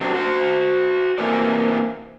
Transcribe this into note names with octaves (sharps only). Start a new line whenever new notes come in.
F#2 C3 F#3 C4 D4
F#4 C5
C3 E3 A#3 A4 D5